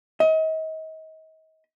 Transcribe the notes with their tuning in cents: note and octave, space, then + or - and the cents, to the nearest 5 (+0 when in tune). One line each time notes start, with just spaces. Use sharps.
D#5 +35